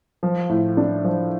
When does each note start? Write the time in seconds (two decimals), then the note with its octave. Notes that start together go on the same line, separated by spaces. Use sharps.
0.23 F3
0.49 A2
0.77 D4
1.04 F3